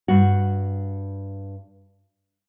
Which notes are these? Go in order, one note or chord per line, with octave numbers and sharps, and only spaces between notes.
G2 F#4